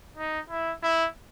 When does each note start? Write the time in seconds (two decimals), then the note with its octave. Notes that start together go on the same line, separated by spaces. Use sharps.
0.17 D#4
0.50 E4
0.83 E4